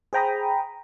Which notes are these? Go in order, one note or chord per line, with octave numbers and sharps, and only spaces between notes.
G#4 C5 G5 A#5 B5 D#6